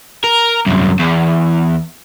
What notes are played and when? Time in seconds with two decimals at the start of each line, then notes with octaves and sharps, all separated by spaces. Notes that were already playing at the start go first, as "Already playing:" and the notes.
0.24 A#4
0.66 C2 F#2
1.00 E2